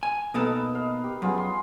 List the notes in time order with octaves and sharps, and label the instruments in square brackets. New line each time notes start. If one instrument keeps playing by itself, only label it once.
[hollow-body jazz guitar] G#5
[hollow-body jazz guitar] B2 A#3 A4 [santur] D#4 B4 D#5
[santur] D#5 F5
G4
[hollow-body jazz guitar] F#2 [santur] B3 F4 G#4
[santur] C6